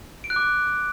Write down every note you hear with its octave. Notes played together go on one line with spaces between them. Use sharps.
D7
F#6
D6